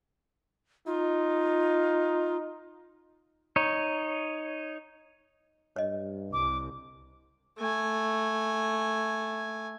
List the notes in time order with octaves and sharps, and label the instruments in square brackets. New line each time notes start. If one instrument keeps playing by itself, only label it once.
[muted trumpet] D#4 [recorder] F4
[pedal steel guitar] D#4 C#5
[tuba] G2 [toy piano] C#5 D#5
[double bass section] C2 [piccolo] D6
[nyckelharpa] A3 G#5